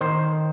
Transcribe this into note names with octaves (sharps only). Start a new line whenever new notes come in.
D#3 C5